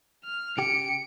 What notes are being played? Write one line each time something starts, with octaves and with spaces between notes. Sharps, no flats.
F6
C#3 G4 C#7 D7